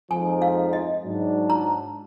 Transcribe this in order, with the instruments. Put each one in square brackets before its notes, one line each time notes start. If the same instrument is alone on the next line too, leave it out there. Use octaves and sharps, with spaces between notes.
[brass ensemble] F2 F3 G#3 D#4 [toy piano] G#5
[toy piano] F5
D#5
[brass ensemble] G#2 F#3 D4
[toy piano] A#5